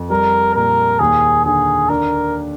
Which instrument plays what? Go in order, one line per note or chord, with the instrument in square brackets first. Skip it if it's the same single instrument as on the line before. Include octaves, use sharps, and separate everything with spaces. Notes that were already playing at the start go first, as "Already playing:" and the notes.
Already playing: [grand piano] F2
[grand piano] G3 [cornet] A#4
[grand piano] A#2 [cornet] A#4
[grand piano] D#2 [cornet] G#4
[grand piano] D3 [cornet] G#4
[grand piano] D4 [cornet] A#4